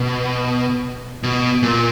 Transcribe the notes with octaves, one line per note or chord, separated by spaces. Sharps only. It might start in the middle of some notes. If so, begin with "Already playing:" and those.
Already playing: B2
B2
A#2